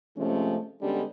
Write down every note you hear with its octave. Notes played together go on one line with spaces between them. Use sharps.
C3 F3 G#3 A3 C#4
D3 G3 G#3 B3 C#4 D4